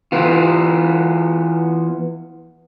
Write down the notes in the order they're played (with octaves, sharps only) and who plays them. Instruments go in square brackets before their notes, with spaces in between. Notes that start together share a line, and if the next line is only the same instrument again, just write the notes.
[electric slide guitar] E3 B3 F4